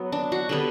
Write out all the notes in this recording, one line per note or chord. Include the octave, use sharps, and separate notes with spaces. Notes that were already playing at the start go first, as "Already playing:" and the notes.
Already playing: F#3 B3
D4
F#4
D3 G3 B3